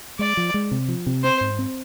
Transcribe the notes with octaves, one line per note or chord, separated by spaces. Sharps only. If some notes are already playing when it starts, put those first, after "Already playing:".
G#3 D5
F3
G#3
C3
F3
C3
C4 C5
G#2
C4